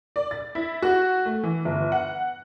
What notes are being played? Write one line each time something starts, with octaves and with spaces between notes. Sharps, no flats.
D5
A6
E4
F#4
A3
E3
G1
F#5